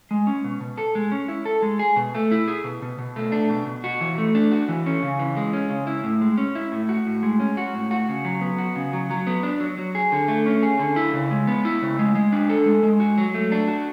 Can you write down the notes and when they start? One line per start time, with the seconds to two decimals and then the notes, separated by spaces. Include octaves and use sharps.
0.11 G#3
0.27 C#4
0.44 B2
0.61 B2
0.78 A4
0.95 G#3
1.12 C#4
1.28 E4
1.45 A4
1.62 G#3
1.79 G#4
1.96 B2
2.14 A3
2.31 E4
2.48 G#4
2.64 B2
2.82 B2
2.99 B2
3.16 A3
3.32 D4
3.49 B2
3.67 B2
3.84 F#4
4.01 E3
4.18 A3
4.35 D4
4.51 F#4
4.68 E3
4.86 C#4
5.03 C#3
5.19 E3
5.37 G#3
5.53 C#4
5.70 C#3
5.87 E4
6.04 A2
6.21 G#3
6.38 C#4
6.55 E4
6.72 A2
6.89 F#4
7.07 A2
7.23 G#3
7.40 C#4
7.57 F#4
7.74 A2
7.91 F#4
8.09 C#3
8.25 F#3
8.41 B3
8.58 F#4
8.76 C#3
8.93 F#3
9.10 F#3
9.27 B3
9.43 D4
9.60 F#3
9.78 F#3
9.95 G#4
10.12 D3
10.28 A3
10.46 C#4
10.63 G#4
10.79 D3
10.96 E4
11.14 C#3
11.31 G#3
11.47 B3
11.65 E4
11.82 C#3
11.99 G#3
12.15 G#3
12.32 D4
12.49 A4
12.66 G#3
12.83 G#3
13.00 F#4
13.18 F#3
13.34 A3
13.52 D4
13.68 F#4